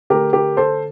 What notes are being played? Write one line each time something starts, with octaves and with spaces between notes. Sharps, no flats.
D3 A3 G4 A#4
G4 A#4
A4 C5